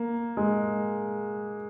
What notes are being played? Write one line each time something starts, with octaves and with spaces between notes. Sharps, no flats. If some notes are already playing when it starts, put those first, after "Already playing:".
Already playing: A#3
G#3